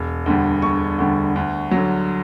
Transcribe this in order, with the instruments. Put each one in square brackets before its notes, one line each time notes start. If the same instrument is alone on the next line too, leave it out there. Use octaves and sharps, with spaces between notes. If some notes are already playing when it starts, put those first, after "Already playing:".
Already playing: [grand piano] E1
D2 D3 G3
E1 C#6
D2 D3 G3
D2
F#3
D3